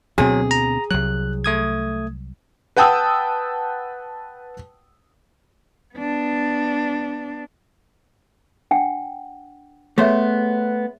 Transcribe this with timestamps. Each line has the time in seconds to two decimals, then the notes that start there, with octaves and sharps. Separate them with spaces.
0.18 D2 B2 F#3 C4 G#4
0.51 A#5
0.91 C2 F#3 F#6
1.44 A3 D#6 G#6
2.77 B4 F#5 G5 A5 D#6 E6
5.95 B3 D4
8.71 D4 F#5 G5
9.98 A3 B3 G#4 C5 C#5 E5